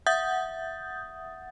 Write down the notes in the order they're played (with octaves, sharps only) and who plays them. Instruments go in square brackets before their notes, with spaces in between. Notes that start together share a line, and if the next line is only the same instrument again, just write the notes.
[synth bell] E5 F#5 D#6 G6 A6